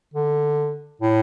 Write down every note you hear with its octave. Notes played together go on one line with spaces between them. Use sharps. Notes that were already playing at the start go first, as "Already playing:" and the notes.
D3
A2